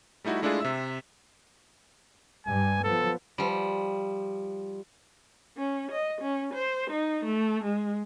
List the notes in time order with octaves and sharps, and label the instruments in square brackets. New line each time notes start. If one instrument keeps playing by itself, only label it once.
[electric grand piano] G3 A3 D#4 E4 F#4
G#3 A3 D4 E4 F4 G#4
C3 E5 E6
[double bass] G2 G3 [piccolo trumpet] G#5
[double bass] F3 B3 [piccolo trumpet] A4
[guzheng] F3 G3
[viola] C#4
D#5
C#4
C5
D#4
A3
G#3